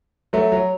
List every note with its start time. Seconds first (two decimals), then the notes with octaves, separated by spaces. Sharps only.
0.33 F#3 A3
0.52 F#3